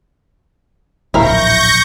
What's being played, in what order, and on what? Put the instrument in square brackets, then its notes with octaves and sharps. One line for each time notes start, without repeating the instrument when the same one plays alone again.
[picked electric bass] D1 A#1 [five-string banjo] E4 A#4 F5 [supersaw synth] C#6 G6 A#6